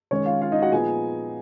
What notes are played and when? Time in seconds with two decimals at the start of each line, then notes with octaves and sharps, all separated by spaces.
0.11 D#3 G#3 C#4 C#5
0.26 F4 F5
0.42 F4 F5
0.52 D#4 D#5
0.62 F#4 F#5
0.72 A#2 F3 B3 D#4 G#4 G#5